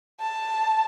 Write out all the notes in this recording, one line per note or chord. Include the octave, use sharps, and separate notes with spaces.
A5